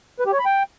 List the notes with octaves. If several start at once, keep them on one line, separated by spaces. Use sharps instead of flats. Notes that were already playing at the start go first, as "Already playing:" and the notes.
B4
G4
C#5
B5
G5